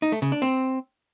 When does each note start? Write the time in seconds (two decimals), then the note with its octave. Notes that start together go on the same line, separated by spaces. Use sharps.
0.02 D#4
0.12 A3
0.22 C#3
0.32 D4
0.42 C4